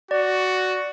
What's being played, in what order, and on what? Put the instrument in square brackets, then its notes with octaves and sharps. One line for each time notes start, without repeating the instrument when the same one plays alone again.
[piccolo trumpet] F#4 [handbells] D5